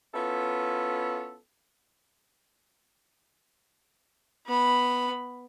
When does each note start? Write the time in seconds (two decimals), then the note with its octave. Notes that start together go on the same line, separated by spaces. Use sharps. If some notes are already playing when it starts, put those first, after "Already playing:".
0.14 B3 C#4 E4 F4 A4
4.47 B3 B5